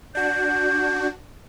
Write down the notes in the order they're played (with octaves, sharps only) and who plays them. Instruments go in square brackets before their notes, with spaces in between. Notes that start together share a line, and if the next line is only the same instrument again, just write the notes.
[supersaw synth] D4 F#4 [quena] G6